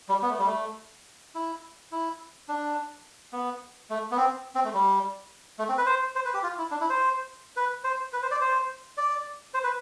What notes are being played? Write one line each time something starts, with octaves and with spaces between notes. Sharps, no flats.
G3
B3
A3
G3
A3
E4
E4
D4
B3
A3
B3
C4
C4
A3
G3
A3
C4
B4
C5
C5
B4
G4
F4
E4
D4
E4
C5
B4
C5
B4
C5
D5
C5
D5
C5
B4